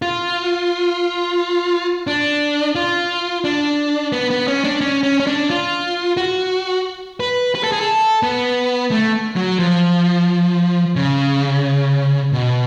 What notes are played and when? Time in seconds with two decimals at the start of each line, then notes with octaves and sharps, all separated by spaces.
0.02 F4
2.07 D4
2.75 F4
3.44 D4
4.12 B3
4.30 B3
4.47 C#4
4.64 D4
4.81 C#4
5.03 C#4
5.20 C#4
5.27 D4
5.50 F4
6.17 F#4
7.20 B4
7.55 B4
7.64 A4
7.72 G#4
7.81 A4
8.23 B3
8.91 A3
9.36 F#3
9.59 F3
10.96 C#3
12.33 B2